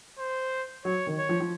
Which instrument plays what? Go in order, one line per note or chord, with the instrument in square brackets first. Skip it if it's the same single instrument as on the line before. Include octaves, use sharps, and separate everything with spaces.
[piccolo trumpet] C5
[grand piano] F#3 [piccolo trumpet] C#5
[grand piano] D#3
[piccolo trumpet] C#5
[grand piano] F3
F3